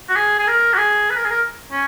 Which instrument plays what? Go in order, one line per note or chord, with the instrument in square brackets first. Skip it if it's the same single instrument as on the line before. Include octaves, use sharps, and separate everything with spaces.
[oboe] F#4
G#4
G#4
A#4
F#4
G#4
B4
A#4
G#4
A#4
C#4